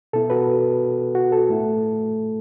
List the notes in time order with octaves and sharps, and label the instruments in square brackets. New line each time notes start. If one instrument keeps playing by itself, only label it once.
[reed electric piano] B2 B3 E4 A4
F#4 B4
F#4
A4
A2 A3 E4